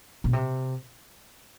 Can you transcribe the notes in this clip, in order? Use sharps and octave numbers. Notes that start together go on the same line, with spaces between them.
B2
C3